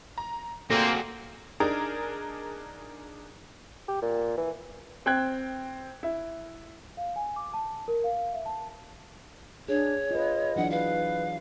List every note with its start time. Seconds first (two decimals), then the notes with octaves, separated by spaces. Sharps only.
0.18 A#5
0.70 A#2 D3 A3 A#3 C4 F#4 G#4
1.60 D4 D#4 G#4 A#4
3.88 G4
4.02 A#2
4.37 E3
5.06 C4 G5 F#6 G#6
6.03 E4
6.97 F5
7.16 G#5
7.36 D6
7.54 A5
7.88 A#4
8.04 F5
8.33 E5
8.46 A5
9.69 D4 G#4 C#5
10.11 F4 B4 D#5
10.56 E3 F#3 D4 F#5
10.71 B4 F5